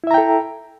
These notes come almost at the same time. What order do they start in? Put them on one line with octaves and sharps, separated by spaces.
E4 E5 A#5 G5 A4